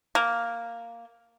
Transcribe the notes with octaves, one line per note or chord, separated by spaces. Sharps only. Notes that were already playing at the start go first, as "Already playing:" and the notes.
A#3